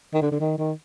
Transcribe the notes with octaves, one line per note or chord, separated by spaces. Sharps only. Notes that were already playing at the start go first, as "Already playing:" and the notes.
D#3
D3
D3
D#3
D#3